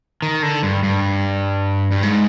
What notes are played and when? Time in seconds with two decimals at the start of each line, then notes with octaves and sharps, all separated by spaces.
0.22 D#3
0.43 D3
0.63 G2
0.83 G2
1.91 G2
2.03 G#2